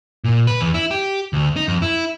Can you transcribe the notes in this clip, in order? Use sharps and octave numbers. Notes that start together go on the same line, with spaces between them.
A#2
B4
E2
E4
G4
D2
D#4
F2
E4